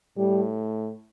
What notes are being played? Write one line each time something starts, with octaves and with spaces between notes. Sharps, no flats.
A2 G3